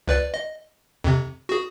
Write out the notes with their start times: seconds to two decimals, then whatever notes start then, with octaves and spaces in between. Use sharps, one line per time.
0.08 C#2 B4 D5
0.34 D#5
1.04 F2 C3
1.49 F#4 G#4